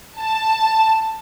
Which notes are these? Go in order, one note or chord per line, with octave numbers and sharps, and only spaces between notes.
A5